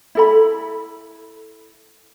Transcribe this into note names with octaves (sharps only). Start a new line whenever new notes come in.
E4 A4 B5